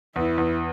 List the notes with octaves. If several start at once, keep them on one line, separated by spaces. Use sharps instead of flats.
E2 E4
E2